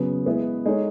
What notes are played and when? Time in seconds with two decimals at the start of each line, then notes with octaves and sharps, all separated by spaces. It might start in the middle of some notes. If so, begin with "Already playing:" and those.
Already playing: C#3 F#3 B3
0.26 G#3 B3 E4 B4
0.66 G#3 D#4 A4 C#5